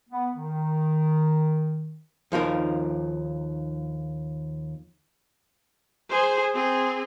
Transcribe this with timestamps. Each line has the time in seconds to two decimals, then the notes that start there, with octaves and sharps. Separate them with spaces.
0.10 B3
0.35 D#3
2.32 D#2 F3 D#4 A#4
6.10 G#4 C5
6.54 C4 G#4